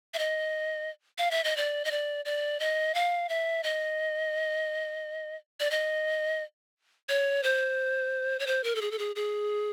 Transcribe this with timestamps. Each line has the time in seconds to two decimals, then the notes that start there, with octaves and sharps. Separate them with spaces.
0.14 E5
0.19 D#5
1.18 F5
1.31 E5
1.44 D#5
1.57 D5
1.85 D#5
1.91 D5
2.25 D5
2.60 D#5
2.95 F5
3.29 E5
3.64 D#5
5.60 D5
5.71 D#5
7.09 C#5
7.43 C5
8.39 C#5
8.47 C5
8.64 A#4
8.75 A4
8.81 G#4
8.91 A4
8.99 G#4
9.16 G#4